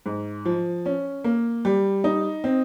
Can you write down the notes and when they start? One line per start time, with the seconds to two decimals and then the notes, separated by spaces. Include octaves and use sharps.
0.06 G#2
0.45 F3
0.86 C#4
1.24 A#3
1.65 G3
2.04 D#4
2.44 C4